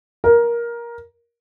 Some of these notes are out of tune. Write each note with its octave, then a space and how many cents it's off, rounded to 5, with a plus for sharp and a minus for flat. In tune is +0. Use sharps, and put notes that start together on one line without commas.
A#4 +15